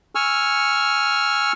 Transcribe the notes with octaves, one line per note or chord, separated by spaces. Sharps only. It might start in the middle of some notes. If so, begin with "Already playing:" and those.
G#5 C#6 E6 F6